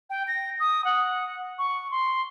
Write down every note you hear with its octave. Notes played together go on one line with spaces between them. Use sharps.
G5
A#6
D#6
F#5
C#6
C6